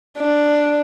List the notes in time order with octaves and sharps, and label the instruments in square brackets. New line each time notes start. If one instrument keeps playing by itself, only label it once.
[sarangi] D4